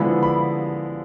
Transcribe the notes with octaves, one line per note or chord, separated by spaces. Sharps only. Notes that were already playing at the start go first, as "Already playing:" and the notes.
Already playing: D3 F3 G#3 B3 E4 B5
B5